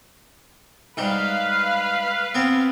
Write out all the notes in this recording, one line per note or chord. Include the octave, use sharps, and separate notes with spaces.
G#2 G3 B4 F5
B3 C4